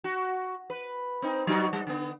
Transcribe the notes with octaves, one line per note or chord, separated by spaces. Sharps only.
F#4
B4
C4 D#4
F#3 D#4 F#4
G3
D3 B3